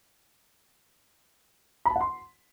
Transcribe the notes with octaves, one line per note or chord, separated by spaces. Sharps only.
B5
A5
F#5
C6